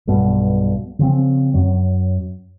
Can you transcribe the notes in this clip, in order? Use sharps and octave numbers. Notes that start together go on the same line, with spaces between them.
B1 G2 B2
C#3 F3 C4
F#2 F#3